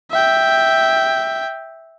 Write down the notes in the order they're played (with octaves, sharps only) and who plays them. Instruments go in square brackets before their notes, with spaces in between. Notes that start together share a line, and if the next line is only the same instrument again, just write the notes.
[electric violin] E5 G5